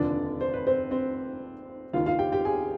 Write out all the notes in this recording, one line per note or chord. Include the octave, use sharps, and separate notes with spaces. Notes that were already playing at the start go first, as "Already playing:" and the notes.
Already playing: F1 D#2 D3 F3 D4 D5
C5
B4
C4 C5
C4 C5
D#2 D#3 F4 F5
F4 F5
G4 G5
G4 G5
G#4 G#5